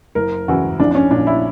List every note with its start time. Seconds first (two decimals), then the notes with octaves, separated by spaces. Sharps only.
0.15 F#1 A#4
0.48 E2 C#3 E3 F#4
0.80 A#1 D4
0.91 D4
0.95 C#4
1.11 A#2 D4
1.27 E4